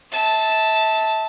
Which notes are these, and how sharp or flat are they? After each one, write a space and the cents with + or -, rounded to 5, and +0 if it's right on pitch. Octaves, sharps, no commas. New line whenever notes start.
E5 -30 A5 +0